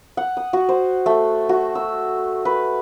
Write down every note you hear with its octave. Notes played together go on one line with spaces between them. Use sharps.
F#5
D#6
F#4
C5
A3
F#4
E6
B4